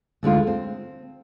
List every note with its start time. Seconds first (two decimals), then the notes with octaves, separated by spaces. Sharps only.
0.23 D2 D3 G#3 F4
0.47 C4